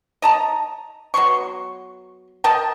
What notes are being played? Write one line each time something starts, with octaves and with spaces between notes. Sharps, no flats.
D#5 A5 A#5
F#3 B3 C6 C#6
A#4 D#5 G5 A5